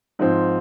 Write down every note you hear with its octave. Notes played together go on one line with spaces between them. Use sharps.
G#2 F3 C4